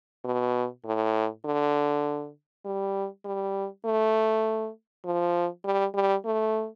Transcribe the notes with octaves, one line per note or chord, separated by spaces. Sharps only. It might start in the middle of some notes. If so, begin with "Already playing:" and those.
B2
A2
D3
G3
G3
A3
F3
G3
G3
A3